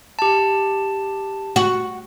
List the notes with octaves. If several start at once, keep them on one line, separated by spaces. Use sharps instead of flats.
G4 A5
F#4